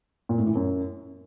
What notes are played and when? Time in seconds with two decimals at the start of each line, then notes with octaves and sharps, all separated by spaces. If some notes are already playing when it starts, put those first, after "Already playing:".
0.29 A#2
0.38 A2
0.47 E3
0.55 F#2